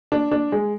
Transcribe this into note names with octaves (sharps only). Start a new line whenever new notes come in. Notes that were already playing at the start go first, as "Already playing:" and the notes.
D4
D4
G#3